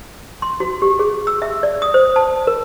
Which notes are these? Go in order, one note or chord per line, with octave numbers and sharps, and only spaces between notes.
C6
F#4
G4
G#4
E6
E5
D5
D#6
C5
A5
A#4